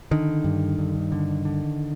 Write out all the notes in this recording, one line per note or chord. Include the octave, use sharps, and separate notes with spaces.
D3 D#3
G2
G2
D3
D3